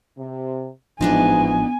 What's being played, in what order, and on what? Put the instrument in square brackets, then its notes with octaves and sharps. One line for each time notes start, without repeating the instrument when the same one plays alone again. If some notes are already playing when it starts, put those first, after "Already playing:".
[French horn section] C3
[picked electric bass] A1 F3 [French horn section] G#2 E3 [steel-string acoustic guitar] B3 D4 D#4 [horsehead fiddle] G#5